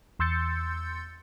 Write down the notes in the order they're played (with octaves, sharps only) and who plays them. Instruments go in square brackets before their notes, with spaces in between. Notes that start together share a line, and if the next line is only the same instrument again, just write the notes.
[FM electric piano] E2 C6 E6 G6 A6 C#7